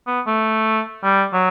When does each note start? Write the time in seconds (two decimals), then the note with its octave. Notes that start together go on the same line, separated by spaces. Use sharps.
0.07 B3
0.27 A3
1.04 G3
1.33 F#3